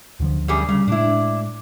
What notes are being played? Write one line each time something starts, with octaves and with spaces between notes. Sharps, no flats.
D2 D3 F3
F#2 G3 G#4
C#3 G3
A2 G#3 D4 E4